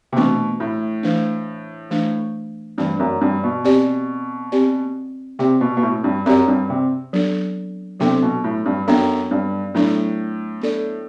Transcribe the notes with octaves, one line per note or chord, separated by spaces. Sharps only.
C3
B2 E3 A3 D4
A2
E3 A3 D4
E3 A3 D4
G2 E3 A3 D4
F#2
G2
B2
C4 G4 D5
C4 G4 D5
C3 C4 G4 D5
B2
B2
A2
G2
F#2 C4 G4 D5
G2
C3
F#3 B3 D4 A4
C3 F#3 B3 D4 A4
B2
A2
G2
F#2 F#3 B3 D4 A4
G2
A2 F#3 B3 D4 A4
B3 D4 A4 D5